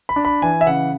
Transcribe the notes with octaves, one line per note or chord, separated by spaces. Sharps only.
B5
D4
B5
E3 G#5
E5
C#3 F#5